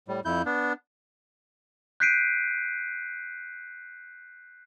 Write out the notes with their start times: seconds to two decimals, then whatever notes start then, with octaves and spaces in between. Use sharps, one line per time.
0.08 A2 G3
0.25 F2 E4 G6
0.46 B3 D4
2.00 F#6 G6 B6 C7 D7 D#7